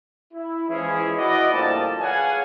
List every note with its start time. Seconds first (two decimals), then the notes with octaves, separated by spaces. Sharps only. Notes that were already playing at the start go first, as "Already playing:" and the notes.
0.33 E4
0.68 E3 F3 G#3 C#4 E4 G#4
1.17 E4 F#4 D5 D#5
1.51 D2 A#2 F3 G3 A5
1.99 G#4 B4 C#5 F5 F#5 G#5